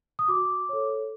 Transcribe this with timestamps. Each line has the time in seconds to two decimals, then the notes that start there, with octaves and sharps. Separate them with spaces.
0.19 D#6
0.28 F#4 D6
0.69 A4 C#5